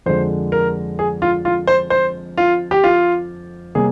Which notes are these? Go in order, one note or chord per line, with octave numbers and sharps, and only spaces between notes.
F2 D3 G#3 C5
A#4
G#4
F4
F4
C5
C5
F4
G4
F4
C3 G3 A#3 G#4